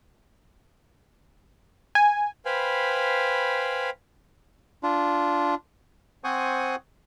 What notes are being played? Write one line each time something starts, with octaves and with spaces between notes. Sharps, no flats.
G#5
B4 C5 F5 G5 G#5 B5
D4 F4
C4 C5 F#5 G#5 C#6 D#6